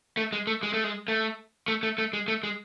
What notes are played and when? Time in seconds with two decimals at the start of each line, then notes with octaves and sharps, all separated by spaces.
0.17 A3
0.33 G#3
0.47 A3
0.63 G#3
0.73 A3
0.84 G#3
1.08 A3
1.68 A3
1.83 A3
1.98 A3
2.13 G#3
2.28 A3
2.43 G#3